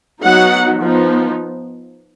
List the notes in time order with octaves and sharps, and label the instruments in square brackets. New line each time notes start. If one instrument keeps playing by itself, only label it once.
[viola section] F#3 B3 D#4 F#5
F3 B3 D#4